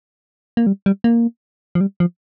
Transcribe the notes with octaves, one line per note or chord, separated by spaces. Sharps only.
A#3
G3
G3
A#3
F3
G3
F3